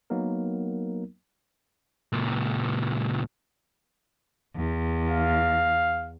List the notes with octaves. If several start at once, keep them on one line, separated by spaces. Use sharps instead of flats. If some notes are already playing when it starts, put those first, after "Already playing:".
F#3 A#3 B3 D#4 A#4
C#2 A#2
E2
F5